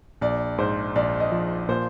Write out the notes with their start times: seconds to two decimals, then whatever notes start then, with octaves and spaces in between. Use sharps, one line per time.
0.21 A#1 D5
0.58 G#2 C5
0.96 A#1 D5
1.20 D#5
1.32 F3
1.69 A#2 C5